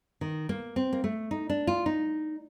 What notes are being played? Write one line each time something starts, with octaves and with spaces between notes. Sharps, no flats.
D#3
A#3
C4
A#3
A3
D#4
D4
F4
D#4